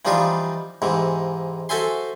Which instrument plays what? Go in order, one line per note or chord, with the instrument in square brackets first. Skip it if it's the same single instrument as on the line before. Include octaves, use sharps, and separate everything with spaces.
[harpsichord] E3 F3 G3 D4 D#4 F4
G#2 C3 E3
F#4 A4 C5 E5 G#5 C6